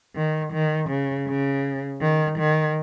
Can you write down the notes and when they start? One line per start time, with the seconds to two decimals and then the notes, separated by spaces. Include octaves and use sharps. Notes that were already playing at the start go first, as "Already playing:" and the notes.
0.16 D#3
0.53 D#3
0.90 C#3
1.28 C#3
2.02 D#3
2.39 D#3